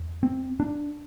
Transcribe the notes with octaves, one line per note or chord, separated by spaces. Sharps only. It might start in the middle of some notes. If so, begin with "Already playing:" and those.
Already playing: E2
C4
D4